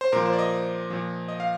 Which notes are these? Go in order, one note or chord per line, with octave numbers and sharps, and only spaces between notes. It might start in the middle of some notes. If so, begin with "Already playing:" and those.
C5
A#2 F3 A#4
C5
D5
D#5
A#2 F3
D#5
F5